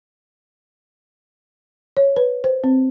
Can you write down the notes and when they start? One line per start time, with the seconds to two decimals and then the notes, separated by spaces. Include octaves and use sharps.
1.97 C#5
2.16 B4
2.44 C5
2.64 C4